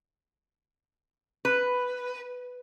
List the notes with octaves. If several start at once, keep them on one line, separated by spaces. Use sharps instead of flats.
B4